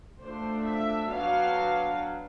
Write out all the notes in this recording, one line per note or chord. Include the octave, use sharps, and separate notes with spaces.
F3 A3 D4 C5
E5
F#3 B3 D4 F5